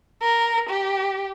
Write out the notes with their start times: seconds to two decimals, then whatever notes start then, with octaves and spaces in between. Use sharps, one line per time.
0.22 A#4
0.69 G4